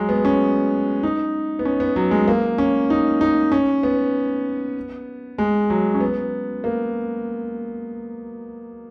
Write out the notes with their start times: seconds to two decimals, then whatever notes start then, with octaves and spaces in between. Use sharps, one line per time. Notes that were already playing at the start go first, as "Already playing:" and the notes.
Already playing: F#3 G#3
0.09 B3
0.25 C#4
1.03 D#4
1.59 B3
1.65 C#4
1.80 B3
1.96 F#3
2.11 G#3
2.28 A#3
2.58 C#4
2.90 D#4
3.21 D#4
3.52 C#4
3.83 B3
5.38 G#3
5.70 F#3
5.94 C#4
6.00 B3
6.64 A#3